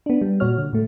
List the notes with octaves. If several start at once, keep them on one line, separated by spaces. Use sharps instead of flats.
B3 D4
G3
A#2 F#4 C#5 F6
D3
A2 A3